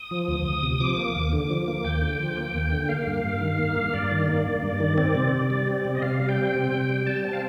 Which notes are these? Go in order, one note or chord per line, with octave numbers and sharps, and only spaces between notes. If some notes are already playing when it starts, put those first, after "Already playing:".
Already playing: D#6
F3
D2
D2
C3
F3 D6
A#3
D#2
D3
F3
A#3
D#2 G5
D3
F3
A#3
D#2
D3
A#3 F5
G2
G2
D#3
A#3
G2
G2 D5
D#3
A#3
G2
G2
D#3
C4 D5
C3
C3
G3
C4
C3
D#5
C3 F5
G3
G5
C4
C3
C3
G3
G3 A5
C4 A5
F5